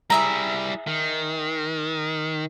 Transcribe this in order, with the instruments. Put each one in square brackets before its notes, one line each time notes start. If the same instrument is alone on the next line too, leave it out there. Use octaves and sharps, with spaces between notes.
[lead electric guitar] G3 E4 [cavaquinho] G#4 E5 A#5
[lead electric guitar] D#3